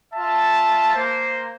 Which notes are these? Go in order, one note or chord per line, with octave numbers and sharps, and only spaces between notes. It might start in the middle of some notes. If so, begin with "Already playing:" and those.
F4 E5 A5
A#3 C5